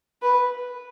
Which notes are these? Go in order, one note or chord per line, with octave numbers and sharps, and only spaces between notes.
B4